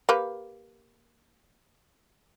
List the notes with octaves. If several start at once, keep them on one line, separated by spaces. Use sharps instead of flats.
A#3 G4 B4